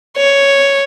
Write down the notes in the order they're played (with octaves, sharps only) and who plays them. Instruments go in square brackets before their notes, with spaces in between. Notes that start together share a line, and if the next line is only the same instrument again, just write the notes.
[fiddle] C#5